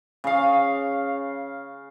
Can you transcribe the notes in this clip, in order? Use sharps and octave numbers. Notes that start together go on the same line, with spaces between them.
C#3 F5